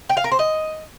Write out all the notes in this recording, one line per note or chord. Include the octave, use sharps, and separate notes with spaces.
G5
F5
A#4
C5
D#5